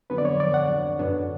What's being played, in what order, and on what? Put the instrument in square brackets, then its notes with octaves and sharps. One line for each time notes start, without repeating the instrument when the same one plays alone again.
[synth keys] F2 D3 F#3 B3 [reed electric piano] B4
[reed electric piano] D5
C#5
D5
F#5
[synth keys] F#2 D3 F#3 B3 D4